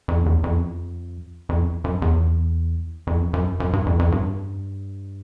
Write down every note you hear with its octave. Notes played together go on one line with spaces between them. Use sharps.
F2
E2
F2
F2
F#2
E2
F2
F#2
F#2
G2
F2
F2
G2